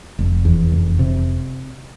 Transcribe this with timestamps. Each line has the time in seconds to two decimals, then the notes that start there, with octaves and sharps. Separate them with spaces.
0.19 F1
0.45 E2
0.72 F1
0.99 C3